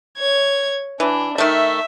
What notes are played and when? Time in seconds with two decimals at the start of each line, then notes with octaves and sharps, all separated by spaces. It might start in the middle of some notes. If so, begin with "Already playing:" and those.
0.18 C#5 G#6
1.00 E3 D4
1.38 D#3 A3 E5